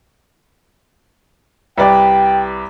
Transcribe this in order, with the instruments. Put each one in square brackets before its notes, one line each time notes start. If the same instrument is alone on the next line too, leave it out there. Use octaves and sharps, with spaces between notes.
[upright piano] C2 B4 D5 [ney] G5